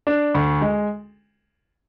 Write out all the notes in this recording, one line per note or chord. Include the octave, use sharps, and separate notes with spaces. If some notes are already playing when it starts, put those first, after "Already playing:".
D4
D2
G#3